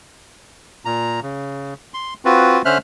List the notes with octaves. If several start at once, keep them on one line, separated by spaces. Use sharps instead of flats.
A#2 A#5
C#3
C6
C4 F4 F#4 B4
D3 C#4 C5 E5 F6 F#6